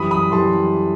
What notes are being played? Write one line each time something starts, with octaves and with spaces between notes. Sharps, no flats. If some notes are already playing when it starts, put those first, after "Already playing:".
Already playing: F#2 E3 G3 B5 D#6
B5 D#6
E3 G3 A5 C6